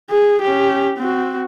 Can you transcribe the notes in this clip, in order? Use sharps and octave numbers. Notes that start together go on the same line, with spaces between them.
G#4
C#4 G4
C4 F#4